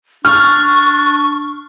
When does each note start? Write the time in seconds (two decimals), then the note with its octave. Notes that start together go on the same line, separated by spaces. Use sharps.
0.25 D4 C#6 F6